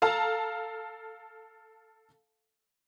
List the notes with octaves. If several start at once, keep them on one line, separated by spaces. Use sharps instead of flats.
A4 F5 A5 A#5